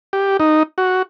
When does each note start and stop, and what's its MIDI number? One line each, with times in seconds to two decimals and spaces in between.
0.13 0.37 67
0.40 0.63 63
0.78 1.02 66